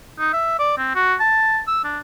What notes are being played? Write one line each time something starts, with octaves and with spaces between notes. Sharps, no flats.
D#4
E5
D5
C4
F#4
A5
E6
D4